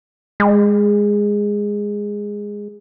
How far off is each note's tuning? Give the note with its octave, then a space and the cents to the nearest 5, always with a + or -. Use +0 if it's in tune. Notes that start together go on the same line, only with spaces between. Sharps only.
G#3 -10